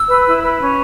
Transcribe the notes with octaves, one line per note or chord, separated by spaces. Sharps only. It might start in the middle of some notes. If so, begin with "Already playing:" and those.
Already playing: E6
B4
E4
B4
C#4